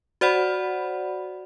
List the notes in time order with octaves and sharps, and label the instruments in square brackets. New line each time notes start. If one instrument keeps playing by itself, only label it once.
[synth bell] F#4 C5 D5 F#5 B5